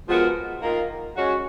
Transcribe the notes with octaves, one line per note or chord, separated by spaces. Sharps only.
F3 G#3 B3 F#4 A#4
D#3 A#3 F4 A#4
G#3 C#4 F#4